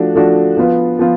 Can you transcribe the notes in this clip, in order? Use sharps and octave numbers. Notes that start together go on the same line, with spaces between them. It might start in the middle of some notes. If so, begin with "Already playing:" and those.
Already playing: F3 A3 D4 F#4
F3 A3 D4 F#4
F3 B3 F4 B4
F3 B3 F4